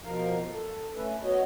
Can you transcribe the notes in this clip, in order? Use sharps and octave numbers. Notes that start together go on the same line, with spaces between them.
B2 F3 A#4 F5
A4
A3 C#4 B4 E5
B3 F#4 C#5 D#5